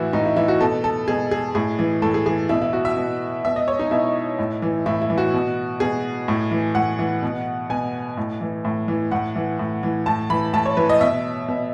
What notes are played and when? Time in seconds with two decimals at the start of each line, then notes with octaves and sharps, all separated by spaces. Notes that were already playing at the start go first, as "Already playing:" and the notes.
Already playing: A2 E3 E4 F#4
0.13 A2 D#4
0.25 E4
0.36 E3 E4
0.48 F#4
0.60 B2 A4
0.84 A4
1.08 B2 G#4
1.31 G#4
1.55 A2 G#4
1.79 E3
2.02 A2 A4
2.14 G#4
2.26 E3 G#4
2.49 B2 E4
2.62 E4
2.73 F#4
2.85 E5
2.97 B2
3.44 B2 E5
3.56 D#5
3.68 C#5
3.79 D#4
3.91 B2 E4
4.39 A2
4.62 E3
4.86 A2 E4
5.02 E4
5.10 E3
5.18 F#4
5.34 B2
5.80 B2 G#4
6.28 A2
6.51 E3
6.75 A2 F#5
6.99 E3
7.23 B2
7.70 B2 G#5
8.17 A2
8.41 E3
8.65 A2
8.88 E3
9.11 A2 F#5
9.36 E3
9.59 A2
9.83 E3
10.06 A2 A5
10.30 E3 B5
10.53 A2 A5
10.66 C#5
10.77 E3 B4
10.89 D#5
11.01 B2 E5
11.48 B2